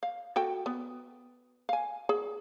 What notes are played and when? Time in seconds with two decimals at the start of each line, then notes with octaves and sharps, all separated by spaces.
0.03 F5
0.36 F#4 A4 G5
0.66 B3
1.69 F5 G#5
2.09 G#4